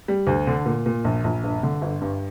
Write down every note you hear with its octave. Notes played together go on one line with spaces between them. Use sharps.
G3
D2
D3
A#2
A#2
A#1
A#1
G1
D3
G1
G2